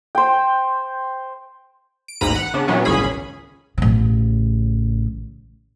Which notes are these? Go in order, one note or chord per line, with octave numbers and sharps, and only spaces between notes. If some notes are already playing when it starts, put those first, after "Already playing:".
C5 G5
D7
A1 D#2 G#2 A#5 B5 D#7
F#5
C#3 B3 D4
A#2 E3 F#3 B3 C#4
G#1 C#2 A#2 C#4 G#4 B5
A1 C#3